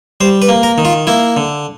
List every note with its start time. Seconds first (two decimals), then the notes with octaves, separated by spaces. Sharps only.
0.21 G3 C5
0.42 B4
0.49 A#3
0.63 A#4
0.78 D#3
0.85 F4
1.07 A#3 E4
1.37 D3